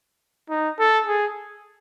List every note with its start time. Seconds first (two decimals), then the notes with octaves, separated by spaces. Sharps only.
0.50 D#4
0.79 A4
1.07 G#4